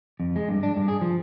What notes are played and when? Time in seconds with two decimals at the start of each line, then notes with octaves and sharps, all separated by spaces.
0.20 F2
0.36 G#3
0.49 G2
0.63 D4
0.77 G2
0.88 G#4
1.01 F3